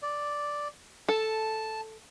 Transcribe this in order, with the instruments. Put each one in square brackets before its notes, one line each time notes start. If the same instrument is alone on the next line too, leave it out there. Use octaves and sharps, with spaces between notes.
[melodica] D5
[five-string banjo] A4 [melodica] A5